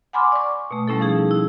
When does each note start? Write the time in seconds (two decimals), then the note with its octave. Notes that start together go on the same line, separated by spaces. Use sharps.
0.13 F#5 G#5 B5 C6 D6 F6
0.32 D5 C#6
0.71 B2 A3
0.88 G3 A3 C#4 E4 A4
1.00 F3 D#4 G#4
1.31 E4